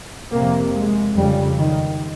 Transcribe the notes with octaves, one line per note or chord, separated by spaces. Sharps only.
F2 C3 A#3
G#3
F2 C#3 G3
D#3